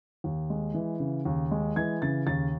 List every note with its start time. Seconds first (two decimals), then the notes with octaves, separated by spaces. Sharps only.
0.24 D#2
0.50 G#3
0.74 E3
1.00 C#3
1.25 D#2
1.51 G#3
1.76 E3 G#6
2.02 C#3 A6
2.27 D#2 A6